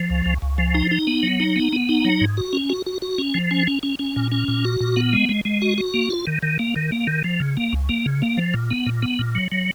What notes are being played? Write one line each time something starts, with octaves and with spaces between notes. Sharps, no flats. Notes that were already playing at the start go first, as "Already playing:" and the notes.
Already playing: F3
C#2
C#2
C#2
F3
D#4
D#4
B3
F#3
D#4
B3
B3
D#4
F#3
G#2
F#4
C#4
F#4
F#4
F#4
C#4
F3
C#4
C#4
C#4
C#4
A#2
C#4
A#2
F#4
A#2
B3
G#3
G#3
G#3
F#4
F#4
A#3
F4
D#3
D#3
A#3
D#3
A#3
D#3
F3
C#3
A#3
C#2
A#3
C#3
A#3
F3
A#2
B3
A#2
B3
A#2
F#3
F#3